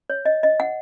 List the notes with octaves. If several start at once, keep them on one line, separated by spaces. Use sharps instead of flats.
C#5
D#5
D#5
F#5